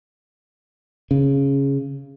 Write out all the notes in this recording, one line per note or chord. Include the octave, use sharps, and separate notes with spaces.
C#3